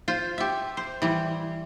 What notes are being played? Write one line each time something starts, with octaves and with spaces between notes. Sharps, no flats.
F4 C5
G4 E5
C5
E3 G3